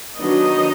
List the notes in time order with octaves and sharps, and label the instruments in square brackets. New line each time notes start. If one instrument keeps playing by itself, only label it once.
[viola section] D#3 F#3 B3 D4 D#4 D#5